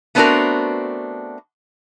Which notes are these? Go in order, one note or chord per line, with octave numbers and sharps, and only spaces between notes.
A3 B3 C4 D4 F#4 A#4